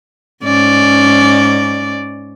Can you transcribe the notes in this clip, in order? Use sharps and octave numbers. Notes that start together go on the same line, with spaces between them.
G#2 C#4 D5